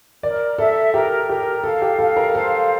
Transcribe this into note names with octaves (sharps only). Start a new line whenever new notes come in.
A#4 D5
A4 E5
G4 A#4
G4 A#4
A4 F5
G4
A4 F5
A#4
A4 C5